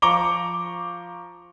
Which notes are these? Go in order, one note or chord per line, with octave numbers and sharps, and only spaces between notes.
F3 A#5 C#6 D6 G7